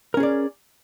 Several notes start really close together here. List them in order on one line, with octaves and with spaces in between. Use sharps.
A#4 C#4 G#4 D5